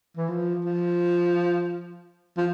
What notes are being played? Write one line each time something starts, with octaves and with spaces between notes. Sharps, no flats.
E3
F3
F3
F3